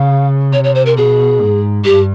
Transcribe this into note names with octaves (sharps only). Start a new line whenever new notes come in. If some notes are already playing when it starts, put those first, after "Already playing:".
Already playing: C#3 F5
C3 C#5
C#5
C5
A#4
B2 G#4
G#2
G2 G4